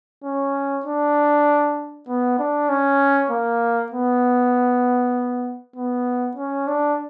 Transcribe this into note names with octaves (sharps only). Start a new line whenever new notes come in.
C#4
D4
B3
D4
C#4
A#3
B3
B3
C#4
D4